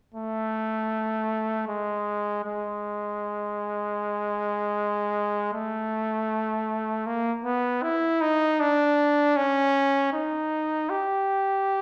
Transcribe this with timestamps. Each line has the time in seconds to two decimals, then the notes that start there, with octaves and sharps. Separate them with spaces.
0.14 A3
1.68 G#3
2.45 G#3
5.53 A3
7.06 A#3
7.44 B3
7.83 E4
8.21 D#4
8.60 D4
9.36 C#4
10.13 D#4
10.90 G4